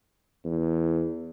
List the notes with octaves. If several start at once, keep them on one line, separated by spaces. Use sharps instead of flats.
E2